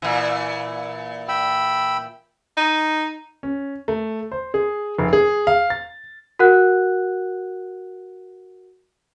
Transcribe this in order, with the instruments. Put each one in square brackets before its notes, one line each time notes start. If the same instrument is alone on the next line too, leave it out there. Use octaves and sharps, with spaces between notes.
[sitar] A#2 E3
[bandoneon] G5 B5 E6
[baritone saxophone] D#4
[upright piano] C#4
A3
C5
G#4
F1
G#4
F5
A6
[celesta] F#4 A#4 F#5 F#6